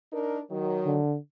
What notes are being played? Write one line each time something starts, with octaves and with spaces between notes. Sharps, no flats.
D4 D#4 A#4
D#3 F#3
D3